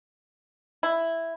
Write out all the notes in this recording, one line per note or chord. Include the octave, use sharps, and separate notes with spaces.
E4